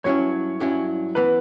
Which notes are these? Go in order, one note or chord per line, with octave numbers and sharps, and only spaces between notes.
G2 F#3 C#4 E4 C#5
G2 F#3 C#4 E4
E3 B3 B4